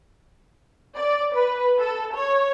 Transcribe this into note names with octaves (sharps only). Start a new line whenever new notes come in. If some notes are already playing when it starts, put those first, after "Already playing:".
D5
B4
A4
C#5